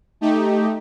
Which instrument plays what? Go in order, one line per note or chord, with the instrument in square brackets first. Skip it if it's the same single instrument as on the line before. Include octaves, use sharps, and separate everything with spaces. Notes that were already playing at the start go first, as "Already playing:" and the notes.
[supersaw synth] A3 D#4 G4